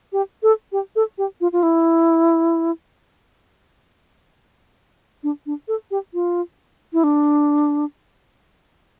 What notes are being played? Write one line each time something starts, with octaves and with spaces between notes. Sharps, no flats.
G4
A4
G4
A4
G4
F4
F4
E4
D4
D4
A4
G4
F4
E4
D4